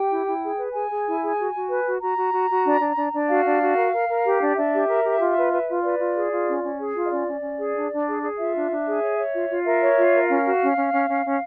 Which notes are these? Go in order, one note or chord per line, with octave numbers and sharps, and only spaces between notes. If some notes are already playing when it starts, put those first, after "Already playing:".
Already playing: G4 G5
E4
E4
G#4
B4
G#4 G#5
G#4
E4
G#4
F#4
F#4
B4
F#4
F#4 A#5
F#4
F#4
F#4
D4
D4
D4
D4
F#4 F5
D4
F#4
A#4
A#4
A#4
G4
D4
D4 E5
G4
A#4
G4
F4
B4
B4
F4
B4 D5
F4
G#4
F4
C#4
C#4
G#4
F4
D#5
C#4 D5
C#4
C#4
G#4
D4
D4
G#4
G#4
F4 E5
D4
D4
G#4
C#5
C#5
F4
F4
A#4 E5
C#5
F4
A#4
C#4 F5
F#4
C#4
C#4
C#4
C#4
C#4